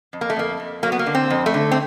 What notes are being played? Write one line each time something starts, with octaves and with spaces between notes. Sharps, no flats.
F2
A#3
A3
F2 A#3
F2
F#3 A#3
B3
A#3
D3
C4
F2
A3
D3
C4